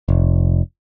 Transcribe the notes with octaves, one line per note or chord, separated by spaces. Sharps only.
F1